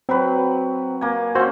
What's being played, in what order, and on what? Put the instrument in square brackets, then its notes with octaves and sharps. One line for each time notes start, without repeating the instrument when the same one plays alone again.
[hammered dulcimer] F#3 B4 [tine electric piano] C4
[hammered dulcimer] A#3 G#5
[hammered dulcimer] C4 C#4 [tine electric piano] F#4 C5